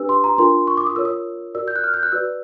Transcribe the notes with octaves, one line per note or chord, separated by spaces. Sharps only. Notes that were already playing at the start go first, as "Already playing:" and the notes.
Already playing: D4 G4 B4 E6
C6
A#5
D4 F4 A#4 C6
C#6
D6
D#6
F4 A#4 C#5 E6
D#6
F#4 A#4 D5 E6
G6
F#6
F6
G6
F#6
F#4 B4 D5 E6